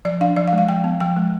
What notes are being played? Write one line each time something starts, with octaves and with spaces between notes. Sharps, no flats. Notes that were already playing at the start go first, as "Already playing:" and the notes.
F3 D5
D4 F5
F3 D5
F5
G#3
F5
F3 G5
B3
F3 G5
G#3